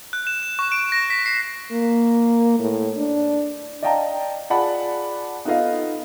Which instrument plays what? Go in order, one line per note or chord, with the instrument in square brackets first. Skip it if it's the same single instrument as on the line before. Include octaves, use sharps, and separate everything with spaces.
[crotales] F#6
E7
E7
C#6
D7
A#6
B6
C7
[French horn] A#3
A2
D4
[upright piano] D5 D#5 F5 G5 A5 A#5
F4 G#4 D5 F#5 A5 B5
B3 D#4 F4 A4 D#5 F5